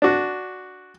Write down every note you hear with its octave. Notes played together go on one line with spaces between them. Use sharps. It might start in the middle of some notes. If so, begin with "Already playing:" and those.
D4 F#4